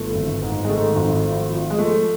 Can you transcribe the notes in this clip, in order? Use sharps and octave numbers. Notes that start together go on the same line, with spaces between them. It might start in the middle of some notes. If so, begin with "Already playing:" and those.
Already playing: G1 A3
G#1
G#2
G#3
D#3 A3
G#1
F3
F3
G#3
F3 A3